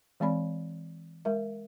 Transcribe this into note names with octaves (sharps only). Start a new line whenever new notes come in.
E3 G#3 C4 D5 B5
G#3 A#4 E5